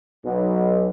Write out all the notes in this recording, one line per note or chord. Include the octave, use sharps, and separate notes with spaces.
B1